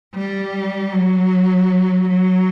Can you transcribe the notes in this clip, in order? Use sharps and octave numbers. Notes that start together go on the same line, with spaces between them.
G3
F#3
F#3